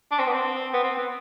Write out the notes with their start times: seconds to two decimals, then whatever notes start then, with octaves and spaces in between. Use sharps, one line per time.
0.11 D4
0.19 C4
0.27 B3
0.34 C4
0.73 B3
0.83 C4
0.98 B3